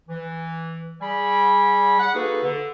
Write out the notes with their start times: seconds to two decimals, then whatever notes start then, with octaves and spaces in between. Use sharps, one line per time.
0.09 E3
1.01 G3 G#4 D5 G#5 B5
1.99 F#5
2.15 A#3 D#4 F#4 G#4 A4 B4
2.43 D3